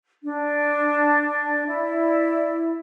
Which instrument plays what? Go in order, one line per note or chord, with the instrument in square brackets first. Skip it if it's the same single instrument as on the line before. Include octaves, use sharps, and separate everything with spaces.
[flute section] D4
E4 D5